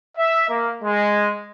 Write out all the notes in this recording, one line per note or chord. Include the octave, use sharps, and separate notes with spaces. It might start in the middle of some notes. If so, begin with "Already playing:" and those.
E5
A#3
G#3